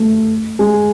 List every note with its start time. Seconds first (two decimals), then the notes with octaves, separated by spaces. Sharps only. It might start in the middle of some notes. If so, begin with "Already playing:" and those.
Already playing: A3
0.59 G#3